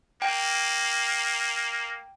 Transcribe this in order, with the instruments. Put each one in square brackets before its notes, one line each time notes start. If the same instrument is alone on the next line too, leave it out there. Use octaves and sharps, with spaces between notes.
[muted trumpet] A#3 [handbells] G5